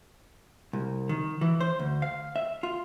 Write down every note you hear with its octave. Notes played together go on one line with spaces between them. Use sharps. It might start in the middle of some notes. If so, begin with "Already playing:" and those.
C2
D#3
E3
C5
D2
F5
E5
F4